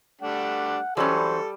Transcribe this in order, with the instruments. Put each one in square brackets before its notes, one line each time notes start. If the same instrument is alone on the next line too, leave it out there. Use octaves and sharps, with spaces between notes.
[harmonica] G3 A3 D4 [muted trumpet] F#5
[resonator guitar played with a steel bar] E3 F#3 C#4 [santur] G3 [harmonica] A4 [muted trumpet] C5